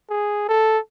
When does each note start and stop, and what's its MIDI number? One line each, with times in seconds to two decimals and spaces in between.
0.10 0.48 68
0.49 0.78 69